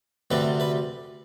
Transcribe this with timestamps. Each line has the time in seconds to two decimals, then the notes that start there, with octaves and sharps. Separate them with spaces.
0.31 D2 C3 G3 B4
0.60 B4